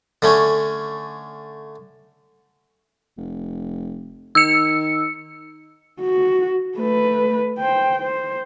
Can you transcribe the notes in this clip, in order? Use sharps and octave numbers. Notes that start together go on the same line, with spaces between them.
D3 A3 C#4
F1
D#3 E6 C#7
F#4
A3 B4
C5 G5
C5